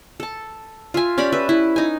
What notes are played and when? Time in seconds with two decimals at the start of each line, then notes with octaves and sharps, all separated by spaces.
0.20 A4 A5
0.94 F4 E5 G#5
1.18 C#4 G4 D5 B5
1.32 B4 E5
1.49 E4
1.76 D#4 G#5